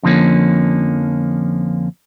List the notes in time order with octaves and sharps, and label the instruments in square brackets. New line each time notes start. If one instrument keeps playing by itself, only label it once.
[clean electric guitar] F2 D3 F3 G3 A#3 C#4